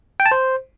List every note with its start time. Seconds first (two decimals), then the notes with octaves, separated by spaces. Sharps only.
0.20 G5
0.26 A5
0.31 C5